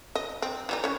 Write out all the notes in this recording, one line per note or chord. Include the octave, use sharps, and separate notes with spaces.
D#5
C4
E3 G3 D#4
C#4 C#5